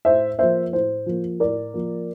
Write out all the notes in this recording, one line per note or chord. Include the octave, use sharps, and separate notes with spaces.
A2 C5 E5
F3 A#3 C5 E5
A2 C5
F3 A#3
A2 A#4 D5
F3 A#3